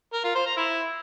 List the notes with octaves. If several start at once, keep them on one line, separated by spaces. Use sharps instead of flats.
A#4
F4
C5
A#5
E4